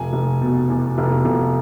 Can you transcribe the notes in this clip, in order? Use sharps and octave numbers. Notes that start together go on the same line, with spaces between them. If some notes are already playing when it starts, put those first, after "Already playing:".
Already playing: F1 G#5
F1
B2
E2
F1
F1